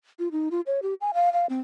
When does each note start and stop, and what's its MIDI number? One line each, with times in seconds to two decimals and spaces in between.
0.19 0.28 65
0.32 0.49 63
0.51 0.61 65
0.67 0.80 73
0.82 0.94 67
1.01 1.11 80
1.14 1.32 77
1.33 1.46 77
1.49 1.60 60